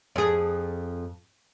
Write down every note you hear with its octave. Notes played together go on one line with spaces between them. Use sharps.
F2 G#4